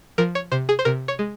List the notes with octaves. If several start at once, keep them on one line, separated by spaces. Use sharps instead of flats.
F3 A#4
C#5
C3 C5
G#4
C5
C3 A#4
C#5
G#3